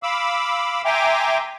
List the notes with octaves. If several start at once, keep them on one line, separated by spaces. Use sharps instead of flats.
F5 B5 D6 E6
E5 G5 G#5 A#5 C6 D6